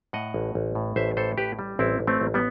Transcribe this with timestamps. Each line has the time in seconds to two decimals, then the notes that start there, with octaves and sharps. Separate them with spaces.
0.13 A2 D#5 F#5
0.34 A1
0.55 A1
0.75 A2
0.96 A1 C5 E5
1.17 A2 A4 C5
1.38 A1 G4 B4
1.59 G3
1.79 A1 C4 E4
2.00 A1
2.07 A3 C4
2.21 A1
2.34 G3 B3